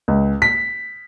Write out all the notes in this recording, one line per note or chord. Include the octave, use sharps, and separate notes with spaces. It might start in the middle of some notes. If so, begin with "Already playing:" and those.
C#2
B6